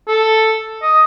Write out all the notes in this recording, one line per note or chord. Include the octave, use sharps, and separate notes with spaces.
A4
D#5